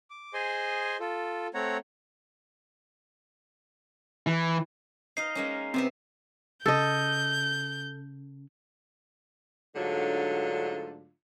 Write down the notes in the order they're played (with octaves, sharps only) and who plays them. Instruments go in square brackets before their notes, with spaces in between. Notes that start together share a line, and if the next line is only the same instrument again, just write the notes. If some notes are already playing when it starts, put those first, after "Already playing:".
[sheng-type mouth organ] D6
G#4 C5 D#5 G#5 C6
F4 A4
A3 C4 C#5 F#5 A#5
[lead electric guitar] E3
[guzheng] D#4 D#5 F5 [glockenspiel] C7
[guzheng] G#3 A#3 C#4
[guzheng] C3 B3 E5 [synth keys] C4
[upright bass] C#3 [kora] A4 D#5 [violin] G6
[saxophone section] G#2 D3 F#3 A3 D4 F4